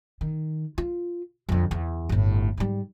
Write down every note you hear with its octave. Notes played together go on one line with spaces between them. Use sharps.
D#3
F4
F2 D3
E2
G1 A2
G#2 G3